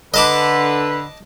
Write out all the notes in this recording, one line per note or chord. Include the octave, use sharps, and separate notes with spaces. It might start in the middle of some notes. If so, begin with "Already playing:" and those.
D3 B4 D#5 A5 D6